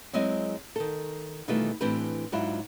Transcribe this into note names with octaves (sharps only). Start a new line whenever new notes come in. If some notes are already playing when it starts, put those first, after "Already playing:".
F#3 G#3 C4 E4 D#5
D#3 A4
B2 D#3 E3 G3 A3 F4
A2 E3 C4 D4 G4 B4
G#2 F#3 D4 E4 F4